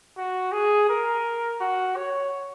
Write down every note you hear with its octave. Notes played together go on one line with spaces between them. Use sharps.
F#4
G#4
A#4
F#4
C#5